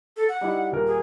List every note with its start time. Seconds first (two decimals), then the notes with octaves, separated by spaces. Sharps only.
0.17 A4
0.29 F#5
0.41 G3 D#4 E4
0.72 D#1 A#4
0.87 G#4